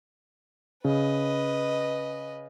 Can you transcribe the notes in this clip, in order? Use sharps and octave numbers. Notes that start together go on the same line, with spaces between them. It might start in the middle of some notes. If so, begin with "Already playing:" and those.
C#3 B4 D#5